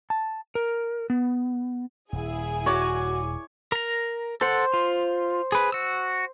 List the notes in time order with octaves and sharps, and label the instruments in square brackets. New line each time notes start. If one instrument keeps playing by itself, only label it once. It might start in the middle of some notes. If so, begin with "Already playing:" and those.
[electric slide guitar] A5
A#4
B3
[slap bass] D#1 [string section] E4 G#4 G#5
[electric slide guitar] F#4 [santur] C#5 D6
[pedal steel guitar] A#4 A#5
[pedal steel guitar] A4 F#5 [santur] C5
[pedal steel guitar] F4
G#4 B4
F#4 E6